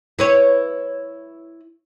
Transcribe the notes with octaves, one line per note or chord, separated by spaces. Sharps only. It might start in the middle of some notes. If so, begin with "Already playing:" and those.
E4 B4 C#5